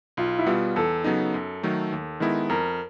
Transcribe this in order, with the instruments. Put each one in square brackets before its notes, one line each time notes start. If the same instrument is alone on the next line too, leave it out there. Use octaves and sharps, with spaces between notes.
[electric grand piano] B1 [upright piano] F4
[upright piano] E4
[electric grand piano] B2 G3 B3 [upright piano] F4
[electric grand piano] E2 [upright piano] A4
[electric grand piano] C#3 F#3 B3 D#4
F#2
D#3 F#3 A3
D#2
D#3 G#3 B3 E4
[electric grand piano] F2 [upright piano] A#4